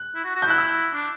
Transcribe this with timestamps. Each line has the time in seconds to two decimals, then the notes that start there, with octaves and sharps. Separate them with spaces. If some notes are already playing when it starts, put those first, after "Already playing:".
Already playing: F#6
0.15 E4
0.24 F#4
0.35 F#4
0.42 G6
0.47 E4 F#6
0.58 E6
0.93 D4